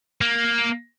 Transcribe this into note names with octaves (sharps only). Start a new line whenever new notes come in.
A#3